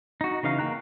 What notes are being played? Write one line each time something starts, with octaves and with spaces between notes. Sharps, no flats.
D#4 F#4
C#3 E3 D#4 F5
A#3 F#4 G5 A#5 F#6